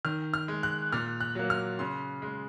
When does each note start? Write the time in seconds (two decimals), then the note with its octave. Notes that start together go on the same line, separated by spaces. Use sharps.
0.05 D#3 F6
0.34 F6
0.48 G#3
0.63 F#6
0.92 A#2 F6
1.20 F#6
1.35 F#3 A#3
1.50 F6
1.79 C#3 C6
2.22 G#3